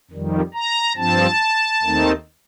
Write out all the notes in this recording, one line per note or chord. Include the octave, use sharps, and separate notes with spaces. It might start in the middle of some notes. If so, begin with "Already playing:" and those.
F2 D#3 G3
A#5
G2 F3 C4 A5
D#2 D#3 A3 C4 D#4